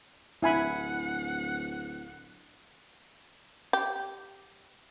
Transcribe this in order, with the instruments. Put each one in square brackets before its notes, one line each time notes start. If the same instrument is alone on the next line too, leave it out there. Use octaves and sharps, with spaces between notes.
[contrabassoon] D1 [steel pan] E4 G#5 B5 [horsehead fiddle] F#5
[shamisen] G4